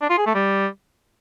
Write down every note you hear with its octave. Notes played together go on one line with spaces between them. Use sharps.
D4
F4
G#4
A3
G3